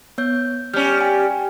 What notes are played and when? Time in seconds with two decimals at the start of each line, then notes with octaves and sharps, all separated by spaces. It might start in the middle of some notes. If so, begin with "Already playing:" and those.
0.18 B3 C#5 G6
0.74 G3 C#4 F6 G6
1.01 G5 G#5